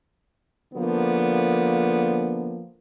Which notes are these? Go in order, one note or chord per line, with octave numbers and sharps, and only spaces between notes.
D3 F3 A#3 B3